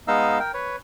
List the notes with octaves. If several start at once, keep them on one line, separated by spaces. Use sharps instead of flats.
G#3 B3 D#4 D#5 F5 E6
A#4 G5
B4 C#5